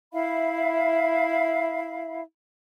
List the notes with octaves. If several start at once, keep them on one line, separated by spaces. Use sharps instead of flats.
E4 E5 F5 B5